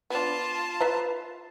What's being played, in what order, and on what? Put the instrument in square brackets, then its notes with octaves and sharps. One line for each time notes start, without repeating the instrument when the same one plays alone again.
[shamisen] B3 D4 [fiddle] F4 A5
[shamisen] B4 E5 A#5